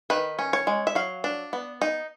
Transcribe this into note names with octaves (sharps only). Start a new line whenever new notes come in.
D#3 B4
C#4
C#5
G#3
E5
F#3 F5
D4
B3
D#4